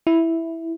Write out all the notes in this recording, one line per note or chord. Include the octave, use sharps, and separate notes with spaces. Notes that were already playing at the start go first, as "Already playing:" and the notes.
E4